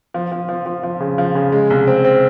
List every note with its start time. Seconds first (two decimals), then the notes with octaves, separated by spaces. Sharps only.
0.14 F3
0.32 F3
0.49 F3
0.66 F3
0.83 F3
1.00 C#3
1.18 F3
1.35 C#3
1.52 G#3
1.70 C2
1.87 C4
2.05 C4